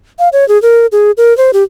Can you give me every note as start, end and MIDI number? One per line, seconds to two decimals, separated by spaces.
0.19 0.29 77
0.33 0.47 73
0.48 0.60 68
0.62 0.86 70
0.92 1.11 68
1.17 1.36 70
1.37 1.51 72
1.53 1.63 67